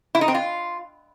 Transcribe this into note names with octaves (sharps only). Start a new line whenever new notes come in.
E4
D#4
C4
F4